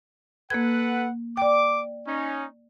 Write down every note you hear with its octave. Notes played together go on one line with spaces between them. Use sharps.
A#3 A4 B4 F#5 G#6
D5 G5 D6
C#4 D#4